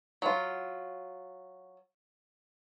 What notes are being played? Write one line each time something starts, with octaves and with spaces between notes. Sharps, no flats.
F#3 F4